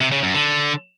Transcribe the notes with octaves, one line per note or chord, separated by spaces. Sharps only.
C3
C#3
F#2
D3